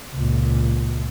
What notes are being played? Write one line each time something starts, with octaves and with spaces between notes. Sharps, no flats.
C#2 A#2